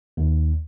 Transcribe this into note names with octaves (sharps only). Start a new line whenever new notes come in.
D#2